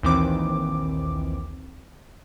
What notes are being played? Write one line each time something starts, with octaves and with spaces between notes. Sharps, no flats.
A#1 D#2 D#3 E3 C4 D6